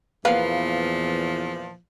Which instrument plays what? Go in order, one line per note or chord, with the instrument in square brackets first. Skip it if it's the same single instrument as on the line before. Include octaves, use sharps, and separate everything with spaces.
[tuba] E2 [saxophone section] A#2 E3 F3 [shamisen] A#3 B3 B4 [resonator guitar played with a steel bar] F5